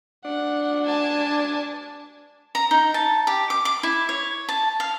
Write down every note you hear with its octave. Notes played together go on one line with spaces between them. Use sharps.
D4 F#5
G#5 A5
A#5
D#4
A5
G4
D6
D6
E4
C#5
A5
F5